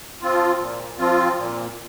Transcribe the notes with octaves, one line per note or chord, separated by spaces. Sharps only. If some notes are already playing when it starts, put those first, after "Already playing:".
F3 C4 F4
A#2
F3 C4 F4
A#2